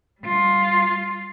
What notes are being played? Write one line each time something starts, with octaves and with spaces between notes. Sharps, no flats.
G3 F4